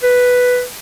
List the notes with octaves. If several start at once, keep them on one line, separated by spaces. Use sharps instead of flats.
B4